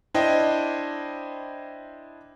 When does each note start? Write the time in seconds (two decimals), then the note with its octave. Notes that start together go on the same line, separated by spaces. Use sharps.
0.14 D4 E4 C5 D#5 G5